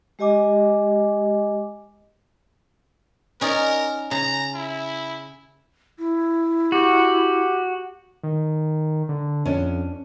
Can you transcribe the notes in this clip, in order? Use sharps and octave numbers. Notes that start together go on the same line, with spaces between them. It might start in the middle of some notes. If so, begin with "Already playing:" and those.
G#3 G4 D#5 G#5 D6
C#4 D#4 A#4 D5
C#3 A#5
E4
E4
F#4 G4
D#3
D3
F2 C#4 D4